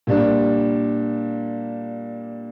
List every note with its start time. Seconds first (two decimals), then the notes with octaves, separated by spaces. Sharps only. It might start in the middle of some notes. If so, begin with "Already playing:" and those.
0.07 A#2 G3 D4